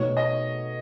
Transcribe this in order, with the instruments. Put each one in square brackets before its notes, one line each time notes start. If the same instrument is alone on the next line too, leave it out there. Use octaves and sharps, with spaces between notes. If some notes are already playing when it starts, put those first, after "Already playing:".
Already playing: [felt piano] B2 A3 D#4 F#4 [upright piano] C#5
[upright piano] D#5